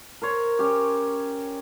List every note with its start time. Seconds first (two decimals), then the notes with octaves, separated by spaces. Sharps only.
0.22 A#4 C5 C#5
0.59 C#4 G4